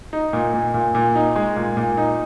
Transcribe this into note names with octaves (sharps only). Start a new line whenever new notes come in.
D#4
A#2
A#2
A#2
A#2
D#4
G#3
A#2
A#2
D#4